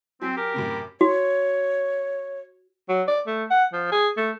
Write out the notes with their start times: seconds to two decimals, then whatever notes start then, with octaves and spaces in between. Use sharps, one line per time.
0.22 F#3 C4 G#5 B6
0.37 G4 A#4
0.54 F#2 A2 C3
1.01 F#4 C#5
2.89 F#3
3.08 D5
3.27 A3
3.50 F#5
3.73 F3
3.92 G#4
4.17 A3